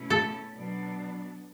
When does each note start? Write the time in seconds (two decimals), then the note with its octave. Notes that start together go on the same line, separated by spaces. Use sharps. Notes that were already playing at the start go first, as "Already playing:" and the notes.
Already playing: B2 A3 C#4 E4
0.10 A4
0.54 B2 F#3 B3 D4